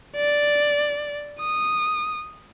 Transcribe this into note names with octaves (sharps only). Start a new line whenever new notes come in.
D5
D#6